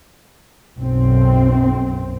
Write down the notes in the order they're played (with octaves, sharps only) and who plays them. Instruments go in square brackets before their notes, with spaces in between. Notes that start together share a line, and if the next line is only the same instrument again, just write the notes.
[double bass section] B1 F#2 C4